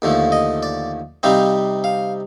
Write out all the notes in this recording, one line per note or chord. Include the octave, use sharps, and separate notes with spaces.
D#2 D3 F3 A3
D#5
D5
C3 G3 C4 D#4 F5
F5